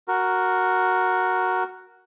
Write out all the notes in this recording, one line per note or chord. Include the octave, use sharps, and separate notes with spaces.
F#4 A#4